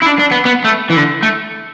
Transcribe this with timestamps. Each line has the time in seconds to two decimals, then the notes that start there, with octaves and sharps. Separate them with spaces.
0.02 E4
0.06 D4
0.19 D4
0.31 B3
0.45 B3
0.64 A3
0.90 E3
0.97 D3
1.23 A3